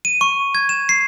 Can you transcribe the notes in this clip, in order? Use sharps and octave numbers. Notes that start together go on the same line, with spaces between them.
D#7
C#6
G#6
E7
C7